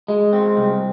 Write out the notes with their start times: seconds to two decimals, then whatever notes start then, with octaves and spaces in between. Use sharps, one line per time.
0.08 G#3
0.33 C4
0.57 C2